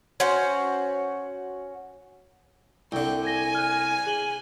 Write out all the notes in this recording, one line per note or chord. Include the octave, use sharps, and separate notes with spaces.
C#4 F#4 C5
C2 D3 G5
G#5 G#6 A#6 G7
F6 F#6
G#4 F#7 G7